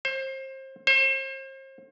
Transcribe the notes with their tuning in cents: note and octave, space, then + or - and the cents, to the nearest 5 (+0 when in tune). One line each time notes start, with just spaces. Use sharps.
C5 +30
C5 +40